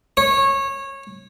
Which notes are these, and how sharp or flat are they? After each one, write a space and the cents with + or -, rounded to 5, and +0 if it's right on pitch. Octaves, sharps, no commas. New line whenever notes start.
C#5 -20